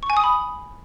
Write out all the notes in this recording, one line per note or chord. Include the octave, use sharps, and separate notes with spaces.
C#6
G#5
D#6
B5